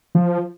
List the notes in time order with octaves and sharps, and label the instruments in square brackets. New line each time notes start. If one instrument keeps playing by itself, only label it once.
[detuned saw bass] F3